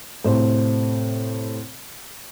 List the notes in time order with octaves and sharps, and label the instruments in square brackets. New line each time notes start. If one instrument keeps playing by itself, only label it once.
[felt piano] A2 C3 C5